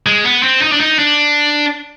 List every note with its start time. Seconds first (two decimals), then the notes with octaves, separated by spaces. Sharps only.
0.06 G#3
0.25 B3
0.43 C4
0.62 D#4
0.72 D4
0.81 D#4
0.99 D4